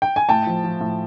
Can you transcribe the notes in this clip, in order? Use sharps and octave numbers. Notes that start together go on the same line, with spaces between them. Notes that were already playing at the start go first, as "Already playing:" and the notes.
G5
G#5
A2 G5 A5
F3
F3
A2